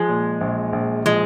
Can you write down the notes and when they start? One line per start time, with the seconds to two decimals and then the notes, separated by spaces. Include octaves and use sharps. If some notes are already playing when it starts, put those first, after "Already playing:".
Already playing: F3 G#3
0.09 A#2
0.41 A#1
0.73 A#1
1.05 F3 G#3